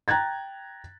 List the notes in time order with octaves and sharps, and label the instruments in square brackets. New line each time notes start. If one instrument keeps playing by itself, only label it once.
[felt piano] G5 A#5 F#6 G#6 A6